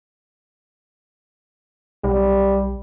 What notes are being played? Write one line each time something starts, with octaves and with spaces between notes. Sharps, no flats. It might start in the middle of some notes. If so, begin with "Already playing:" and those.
B1 G3